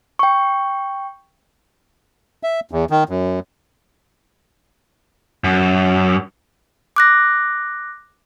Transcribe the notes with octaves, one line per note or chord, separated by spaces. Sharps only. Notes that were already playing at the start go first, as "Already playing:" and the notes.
G5 C#6
E5
E2
D#3
F#2
F#2
D6 F#6 A#6